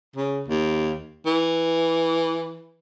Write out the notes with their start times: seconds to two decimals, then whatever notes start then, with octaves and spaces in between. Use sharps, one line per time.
0.16 C#3
0.49 D#2
1.27 E3